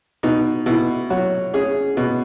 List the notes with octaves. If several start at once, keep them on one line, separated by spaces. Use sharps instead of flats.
B2 D#4
B2 E4
F#3 F#4
C#4 G#4
B2